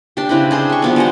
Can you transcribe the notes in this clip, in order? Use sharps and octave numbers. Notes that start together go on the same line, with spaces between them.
D4 G4
C#3 C4 E4 B4
D4 G#4 C5
G4 C#6
F3 B3 D4
G3 G#3 F#5